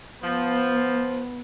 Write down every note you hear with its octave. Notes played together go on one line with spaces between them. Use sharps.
F3 B3